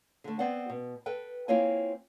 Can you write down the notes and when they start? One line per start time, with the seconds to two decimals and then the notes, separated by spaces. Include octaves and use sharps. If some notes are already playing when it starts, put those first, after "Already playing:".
0.24 D3 A3
0.39 B3 C4 D5 F#5
0.70 B2
1.06 A4 B4 G5
1.48 A#3 C4 E4 F4 C#5 G#5